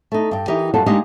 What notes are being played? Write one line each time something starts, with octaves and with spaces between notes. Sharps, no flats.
A3 D#4
G2 G5
E3 D#4 G4 A#4
F#2 G3 F4 A4 F#5 A5
G#3 A#3 D4 D#4 G4